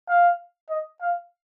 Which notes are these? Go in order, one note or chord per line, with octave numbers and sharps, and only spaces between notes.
F5
D#5
F5